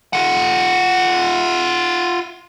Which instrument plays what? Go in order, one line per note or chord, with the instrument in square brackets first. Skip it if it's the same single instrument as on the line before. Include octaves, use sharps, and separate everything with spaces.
[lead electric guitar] F4 F#5